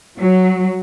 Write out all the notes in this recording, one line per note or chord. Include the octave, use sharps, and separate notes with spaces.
F#3